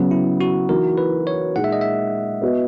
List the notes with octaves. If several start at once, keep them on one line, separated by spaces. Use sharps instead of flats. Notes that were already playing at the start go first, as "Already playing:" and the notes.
Already playing: C#3 F#3 B3
E4
F#4
E3 A#3 D#4 F#4 A#4
B4
C#5
A#2 G#3 D#4 G#4 F#5
E5
D#5
E5
B3 F#4 B4 D#5